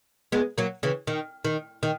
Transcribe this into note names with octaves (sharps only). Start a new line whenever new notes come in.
G#3 B3
F#3 A#3
C#3 E3
D#3
D#3
D#3